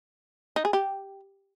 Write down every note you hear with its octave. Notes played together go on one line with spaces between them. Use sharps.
D#4
G#4
G4